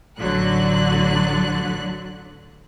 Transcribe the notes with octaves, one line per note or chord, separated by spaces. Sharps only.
A1 D3 F#3 F#6